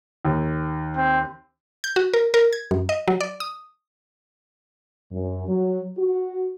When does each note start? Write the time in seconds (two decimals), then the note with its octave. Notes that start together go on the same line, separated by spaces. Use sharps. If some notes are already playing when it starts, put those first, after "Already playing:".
0.25 D#2
0.97 C4
1.84 G6
1.96 F#4
2.13 A#4
2.34 A#4
2.53 G#6
2.71 F#2
2.89 D#5
3.08 F#3
3.21 D5
3.40 D#6
5.11 F#2
5.49 F#3
5.98 F#4